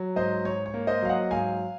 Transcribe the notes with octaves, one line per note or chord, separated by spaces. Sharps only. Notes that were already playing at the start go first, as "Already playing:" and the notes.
Already playing: F#3
G#2 C5 D#5
G#2 C#5
C#5
A#3
C5 D#5
F#3 F5
D#5 F#5
G#2 F5 G#5